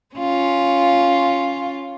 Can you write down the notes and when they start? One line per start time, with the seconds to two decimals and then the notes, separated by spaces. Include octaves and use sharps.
0.16 C#4 F4